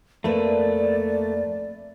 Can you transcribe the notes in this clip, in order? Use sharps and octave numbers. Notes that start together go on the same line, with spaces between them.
F2 A3 A#3 B4 D5